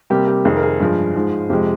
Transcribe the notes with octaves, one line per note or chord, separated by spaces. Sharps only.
C3 G3 A#3 G4
G4
F2 C3 D#3 G#4
A#4
G#4
G2 F3 G#3
G#2 F3 G#3
F2 C3 F3 G#3 G4